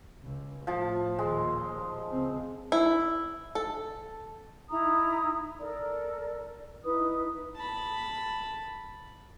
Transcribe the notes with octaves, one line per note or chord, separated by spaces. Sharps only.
C#2
A2 F3 A5
D#2 A#2 G#3
C#2 C4
E4
A4
D#4 E4 A#5 D#6
A4 A#4 D5
D#4 E4 B4 D#6
A5 B5